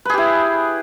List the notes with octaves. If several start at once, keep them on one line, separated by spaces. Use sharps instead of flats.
E4 G4 G#4 B4